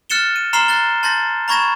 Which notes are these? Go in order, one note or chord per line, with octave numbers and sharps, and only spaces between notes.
F6 F#6 A6 C#7 E7 G7
D#7
A#5 C6 F6 C7 E7 G7
F#6 A6 G7
A5 C6 G6 A6 A#6
A#5 B5 C#6 G#6 A#6 E7